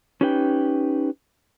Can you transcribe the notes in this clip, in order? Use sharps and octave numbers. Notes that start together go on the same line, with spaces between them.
C#4 D#4 G4 B4 E5 G5